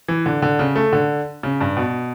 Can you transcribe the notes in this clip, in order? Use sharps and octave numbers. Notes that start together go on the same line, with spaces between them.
E3
D3
D3
C#3
A3
D3
C#3
G2
B2